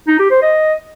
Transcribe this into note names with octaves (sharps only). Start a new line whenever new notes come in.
D#4
G4
C5
D#5